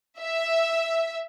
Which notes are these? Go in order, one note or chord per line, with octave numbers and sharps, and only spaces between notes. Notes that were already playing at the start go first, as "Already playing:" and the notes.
E5